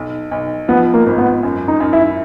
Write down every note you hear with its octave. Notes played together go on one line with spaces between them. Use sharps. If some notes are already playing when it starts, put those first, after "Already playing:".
Already playing: B1
B1
F3 B3
A#3
G#1
B3
F#2
D#4
F#2
E4